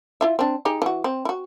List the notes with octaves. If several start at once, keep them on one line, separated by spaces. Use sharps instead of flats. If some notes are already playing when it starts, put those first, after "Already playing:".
E4 F4 E5
C4 D4
D#4 G4 G#4
E3 F#4
C4
E4 F#4